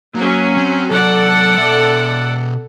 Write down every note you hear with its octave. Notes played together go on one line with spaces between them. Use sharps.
F#3 A#3 C#4
C4
C3 F#3 A4 D5 F#5
B2 E5